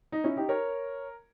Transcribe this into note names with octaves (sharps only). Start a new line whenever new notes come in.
D#4
C#4 E4
D#4 G4
A#4 C#5